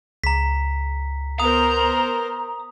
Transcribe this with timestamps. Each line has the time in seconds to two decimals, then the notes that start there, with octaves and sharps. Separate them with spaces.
0.24 C#2 A#5 B6
1.40 B3 A#4 C5 A#5 D#6